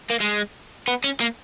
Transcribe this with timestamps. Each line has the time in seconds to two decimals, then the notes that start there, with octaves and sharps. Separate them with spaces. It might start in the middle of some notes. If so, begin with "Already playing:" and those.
0.10 A#3
0.20 G#3
0.88 B3
1.04 C#4
1.21 A#3